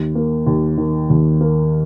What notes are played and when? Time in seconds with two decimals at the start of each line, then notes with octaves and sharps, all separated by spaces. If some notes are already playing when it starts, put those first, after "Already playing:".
Already playing: D#2
0.15 A#3
0.47 D#2
0.78 D#3
1.10 D#2
1.41 A#3